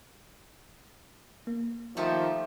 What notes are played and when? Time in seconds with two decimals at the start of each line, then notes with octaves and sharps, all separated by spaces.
1.47 A#3
1.97 D#3 F3 A3 G4 E5